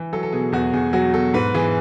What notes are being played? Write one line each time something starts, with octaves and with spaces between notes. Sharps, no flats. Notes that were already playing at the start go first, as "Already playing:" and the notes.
Already playing: E3
F#3 A4
A4
B2 G#4
E2 F#4
E2 G#4
F#3 F#4
B2 A4
G#2 B4
E3 G#4